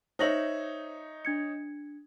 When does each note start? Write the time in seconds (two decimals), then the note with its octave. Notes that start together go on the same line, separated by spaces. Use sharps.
0.19 D#4 C5 C#5 E5 A#6 F#7
1.25 D4 G#6 C#7